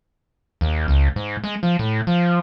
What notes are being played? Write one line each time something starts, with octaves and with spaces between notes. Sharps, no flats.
D#2
C#2
G#2
G#3
F3
A2
F3